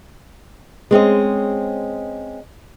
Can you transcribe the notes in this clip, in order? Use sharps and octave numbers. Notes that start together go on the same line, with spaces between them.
G#3 C4 C#4 D#5